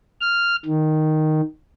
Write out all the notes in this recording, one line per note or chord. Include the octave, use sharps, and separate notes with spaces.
F6
D#3